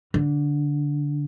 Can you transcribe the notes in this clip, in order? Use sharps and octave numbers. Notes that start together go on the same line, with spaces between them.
D3